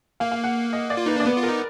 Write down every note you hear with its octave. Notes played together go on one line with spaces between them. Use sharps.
A#3 F5
F5
F#5
D#5
D5
F4
D#4 B4
D4 D5
B3 B4
F4
A#4
D#4